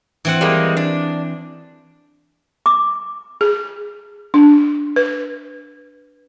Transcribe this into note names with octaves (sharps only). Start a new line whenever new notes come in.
E3 C4 F#5
G3 G#3 A#3
D4
D6
G#4
D4
B4